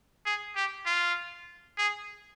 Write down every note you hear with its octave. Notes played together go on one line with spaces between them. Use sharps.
G#4
G4
F4
G#4